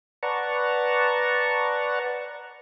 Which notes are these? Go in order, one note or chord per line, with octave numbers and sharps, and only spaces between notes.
B4 D5 F#5 A5 A#5 C#6